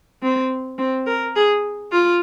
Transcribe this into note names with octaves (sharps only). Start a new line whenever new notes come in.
C4
C4
A#4
G#4
F4